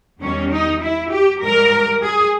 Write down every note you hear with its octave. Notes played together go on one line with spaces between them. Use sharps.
E2 D#3 G3 C#4
D#4
E4
G4
G#2 E3 G3 A#4
G#4